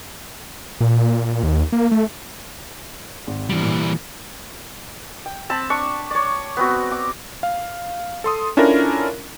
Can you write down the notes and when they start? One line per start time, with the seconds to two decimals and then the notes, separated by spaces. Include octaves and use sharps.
0.81 A#2
1.43 D#2
1.72 A#3
1.92 A3
3.27 G#1
3.49 E3 G3
3.62 A#2
5.26 G5
5.50 C4 A5 B5
5.70 D4 C#6
6.11 C#5 D5
6.57 B3 C4 F#4
6.92 D6
7.43 F5
8.24 A4 C6 D#6
8.57 C#4 D4 E4 F4 A4 A#4